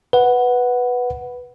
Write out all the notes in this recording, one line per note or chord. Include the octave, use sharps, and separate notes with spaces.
B4 F#5